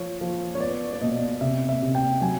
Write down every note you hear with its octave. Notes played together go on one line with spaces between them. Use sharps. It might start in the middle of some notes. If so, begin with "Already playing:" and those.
Already playing: F3 C#5
F3
C#5
B3 D5
D5
B2 D#5
C3 E5
E5
C3
G5
F#3 G#5